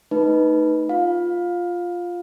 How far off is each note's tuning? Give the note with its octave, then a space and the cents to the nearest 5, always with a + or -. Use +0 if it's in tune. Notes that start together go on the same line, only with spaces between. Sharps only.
A3 +15 D#4 +0 B4 -5
F4 +0 F5 +20